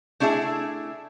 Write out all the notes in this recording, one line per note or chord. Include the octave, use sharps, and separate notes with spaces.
A3 D4 E4 G#4 E5